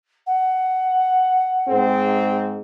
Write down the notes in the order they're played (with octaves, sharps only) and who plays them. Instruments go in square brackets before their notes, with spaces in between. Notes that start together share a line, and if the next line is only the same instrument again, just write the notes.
[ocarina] F#5
[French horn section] G#2 C4 G#4